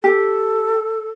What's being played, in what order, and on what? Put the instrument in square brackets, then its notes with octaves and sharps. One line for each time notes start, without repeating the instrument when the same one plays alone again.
[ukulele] G4 [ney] A4